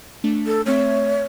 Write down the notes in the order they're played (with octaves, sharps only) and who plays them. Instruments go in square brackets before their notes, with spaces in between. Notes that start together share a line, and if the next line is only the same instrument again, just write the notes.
[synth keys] A3 D4
[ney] A4
[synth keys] A3 C4 E5 [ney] C#5